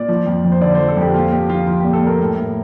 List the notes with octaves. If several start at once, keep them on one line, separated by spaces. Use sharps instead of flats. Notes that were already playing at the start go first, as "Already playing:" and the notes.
Already playing: A#2 D5
F3
F2
F2
C5
D3 D5
C5
F3
A4
F2 G4
A#2 F4
A#2 G4
F3 F4
F3 F4
G4
A#2
A4
A#2 A#4
A2
A2